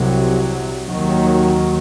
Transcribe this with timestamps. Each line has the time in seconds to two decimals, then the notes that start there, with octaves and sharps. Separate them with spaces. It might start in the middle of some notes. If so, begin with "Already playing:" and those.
Already playing: C2 C3 F#3
0.88 D#2 D#3 F#3